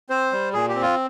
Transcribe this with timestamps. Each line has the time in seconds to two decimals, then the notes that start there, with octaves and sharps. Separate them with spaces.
0.10 C4 C5
0.32 G3
0.53 A#2 G#4
0.69 G4
0.75 C4
0.82 F4